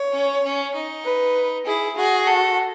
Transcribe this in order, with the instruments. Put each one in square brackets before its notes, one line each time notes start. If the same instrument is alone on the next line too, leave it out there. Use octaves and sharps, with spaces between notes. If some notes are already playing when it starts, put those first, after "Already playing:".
Already playing: [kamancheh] C#5
[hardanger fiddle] C#4
C#4
D#4
[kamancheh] B4
[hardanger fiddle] E4 [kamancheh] G#4
[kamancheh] F#4 [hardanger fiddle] G#4
[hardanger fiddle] A4